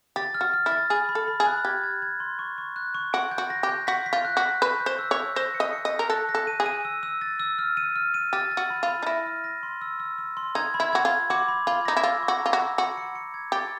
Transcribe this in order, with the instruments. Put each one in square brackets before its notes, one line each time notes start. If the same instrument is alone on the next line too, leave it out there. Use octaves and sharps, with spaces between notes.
[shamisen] G4 [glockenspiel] A6
[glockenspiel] F6
[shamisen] F#4
[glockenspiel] F6
[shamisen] E4
[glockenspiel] A6
[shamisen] G#4 [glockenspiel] B5
[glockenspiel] B5
[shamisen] A4
[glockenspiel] B5
[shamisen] G#4
[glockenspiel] F#6
[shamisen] G4 [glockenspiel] G#6
[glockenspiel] G#6
G#6
C6
C#6
C#6
F#6
C#6
[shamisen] F#4 [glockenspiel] D7
[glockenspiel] G6
[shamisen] F#4
[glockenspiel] A#6
[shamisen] G4
[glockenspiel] G6
[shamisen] F#4 [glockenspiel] B6
[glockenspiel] B6
[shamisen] F4
[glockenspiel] F#6
[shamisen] F#4
[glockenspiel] B6
[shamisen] B4 [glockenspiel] C#6
[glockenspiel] G6
[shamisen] C5
[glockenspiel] E6
[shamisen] C#5
[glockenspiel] E6
[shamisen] C5 [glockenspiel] A#6
[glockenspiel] C#7
[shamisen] D#5
[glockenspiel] C#7
[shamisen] D#5
[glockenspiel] A#6
[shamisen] A#4
[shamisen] A4 [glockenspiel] F#6
[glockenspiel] A#6
[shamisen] A4
[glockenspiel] D#7
[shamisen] G#4
[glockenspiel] D#7
E6
E6
A6
E6
F6
D#7
F6
D#7
[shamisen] G4 [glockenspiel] A6
[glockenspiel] A6
[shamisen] F#4
[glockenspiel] B5
[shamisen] F4
[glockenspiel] B5
[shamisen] D#4
[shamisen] E4 [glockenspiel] A#6
[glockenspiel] F6
A#6
C6
E6
E6
E6
C6
[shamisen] D#4 [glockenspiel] G#6
[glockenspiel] B5
[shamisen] E4
[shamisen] F#4 [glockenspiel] G#6
[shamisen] F4
[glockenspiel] G#6
[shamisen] F#4 [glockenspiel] D6
[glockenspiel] B5
[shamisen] F4 [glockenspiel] B5
[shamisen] D#4 [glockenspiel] A#6
[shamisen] E4
[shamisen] F4 [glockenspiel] E6
[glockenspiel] C#6
[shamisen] F#4
[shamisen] F4 [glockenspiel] A#5
[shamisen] F#4
[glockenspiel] E6
[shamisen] F#4 [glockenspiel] C#7
[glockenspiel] C#7
C#7
G#6
[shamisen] G4 [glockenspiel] A6